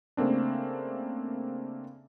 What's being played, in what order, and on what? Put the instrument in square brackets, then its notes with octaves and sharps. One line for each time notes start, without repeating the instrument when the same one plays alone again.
[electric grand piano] C#3 A3 A#3 C4 D4